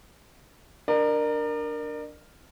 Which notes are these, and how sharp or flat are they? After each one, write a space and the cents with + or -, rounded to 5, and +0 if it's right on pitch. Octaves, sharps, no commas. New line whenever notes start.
D4 +0 A#4 +0 D5 +40